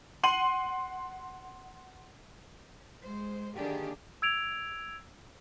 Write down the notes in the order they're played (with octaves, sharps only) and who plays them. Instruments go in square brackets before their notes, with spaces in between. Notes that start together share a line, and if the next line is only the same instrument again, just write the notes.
[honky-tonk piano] F#5 C6 D#7 F#7
[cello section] G#3 C5
D3 D#3 A#3 D4 G4 G#4
[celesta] E6 G#6 D7 F7